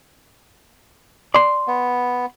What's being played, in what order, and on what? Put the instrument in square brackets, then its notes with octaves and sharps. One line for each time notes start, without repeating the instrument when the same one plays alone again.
[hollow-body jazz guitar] D5 C6
[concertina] B3